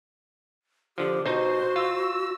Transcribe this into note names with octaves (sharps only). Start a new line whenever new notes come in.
D3 F3 G4
B2 D#4 F#4 C5
F4 E6